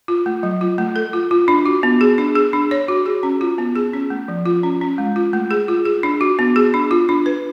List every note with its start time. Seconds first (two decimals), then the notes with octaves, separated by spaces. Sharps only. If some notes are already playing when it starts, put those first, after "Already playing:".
0.08 F4
0.26 A3
0.43 F#3
0.61 F4
0.78 A3
0.96 A4
1.13 F4
1.31 F4
1.48 D4
1.66 F#4
1.83 B3
2.01 G#4
2.18 D4
2.36 G#4
2.53 D4
2.71 C#5
2.88 F#4
3.06 G#4
3.23 C#4
3.41 F4
3.58 B3
3.76 G#4
3.93 C#4
4.10 A3
4.28 F3
4.46 F4
4.63 C#4
4.81 C#4
4.98 G#3
5.16 F4
5.33 A3
5.51 G#4
5.68 F4
5.85 G#4
6.03 D4
6.21 F#4
6.39 B3
6.56 G#4
6.74 D4
6.91 F4
7.09 D4
7.26 B4